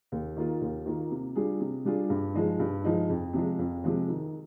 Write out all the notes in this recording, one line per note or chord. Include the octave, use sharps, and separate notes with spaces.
D#2
D#3 A#3 F4
D#2
D#3 A#3 F4
C3
G3 D4 F4 G#4
C3
G3 D4 F4 G#4
G2
F3 G#3 D#4
G2
F3 G#3 D#4
F2
C3 F3 G#3
F2
C3 F3 G#3
D#3